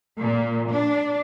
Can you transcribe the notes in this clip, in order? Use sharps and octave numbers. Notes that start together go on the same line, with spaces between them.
A#2
D4